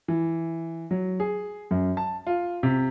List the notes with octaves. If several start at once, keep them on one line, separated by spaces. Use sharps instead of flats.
E3
F#3
G#4
F#2
A5
F4
C3